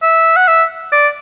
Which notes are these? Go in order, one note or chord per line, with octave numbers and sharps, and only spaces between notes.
E5
F#5
E5
D5